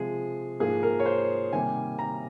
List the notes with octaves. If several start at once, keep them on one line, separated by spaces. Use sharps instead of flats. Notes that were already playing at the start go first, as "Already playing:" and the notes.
Already playing: C3 F3 G#3 G#4
G#2 F3 A#3 G#4
A#4
C#5
C5
C3 D#3 G3 A#3 G#5
A#5